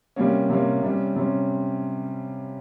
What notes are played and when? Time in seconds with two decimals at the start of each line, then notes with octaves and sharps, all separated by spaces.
0.16 C3 G3 A#3 C#4
0.50 C3 G3 A#3 C#4
0.83 C3 G3 C#4
1.16 C3 G3 C#4